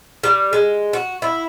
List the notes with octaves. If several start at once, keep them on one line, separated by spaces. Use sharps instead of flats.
G3
G#3
F#4
E4